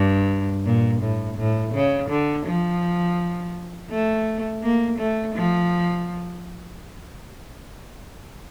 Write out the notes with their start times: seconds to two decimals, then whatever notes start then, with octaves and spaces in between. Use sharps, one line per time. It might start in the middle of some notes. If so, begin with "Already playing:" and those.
Already playing: G2
0.65 A#2
1.02 A2
1.38 A2
1.74 C#3
2.09 D3
2.46 F3
3.90 A3
4.63 A#3
4.99 A3
5.35 F3